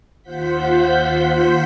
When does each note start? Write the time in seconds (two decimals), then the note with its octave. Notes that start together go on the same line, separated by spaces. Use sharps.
0.22 D#2 F4 C5 F#5 G6 B6